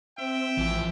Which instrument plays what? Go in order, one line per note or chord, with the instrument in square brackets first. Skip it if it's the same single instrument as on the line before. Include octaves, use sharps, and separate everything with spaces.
[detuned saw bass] C4 [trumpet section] E5 G5
[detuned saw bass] A1 [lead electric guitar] E3 F3